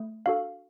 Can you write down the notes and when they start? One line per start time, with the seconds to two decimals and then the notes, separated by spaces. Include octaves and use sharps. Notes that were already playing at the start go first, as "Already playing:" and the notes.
Already playing: A3
0.26 D4 F#4 A4 F5